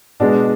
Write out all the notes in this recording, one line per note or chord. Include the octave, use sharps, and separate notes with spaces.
B2 G#3 D4